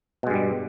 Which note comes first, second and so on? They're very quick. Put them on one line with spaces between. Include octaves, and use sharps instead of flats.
B2 G#3 G2 G3